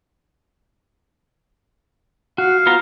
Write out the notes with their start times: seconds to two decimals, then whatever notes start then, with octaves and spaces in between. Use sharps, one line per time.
2.38 F#4 F5
2.66 B3 F4 A#5